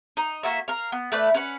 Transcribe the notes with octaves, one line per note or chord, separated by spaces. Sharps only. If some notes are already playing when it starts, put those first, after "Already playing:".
D#4
A#3 F#4 E5
A#4 F5
B3
A3 B4 D5
C#4 B4 F#5